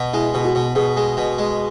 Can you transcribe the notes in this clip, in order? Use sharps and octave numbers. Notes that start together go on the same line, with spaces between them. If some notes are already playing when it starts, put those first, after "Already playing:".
Already playing: B2
G#3 E4
B2
F#4
B2
B2 G#4
G#3
B2
G#3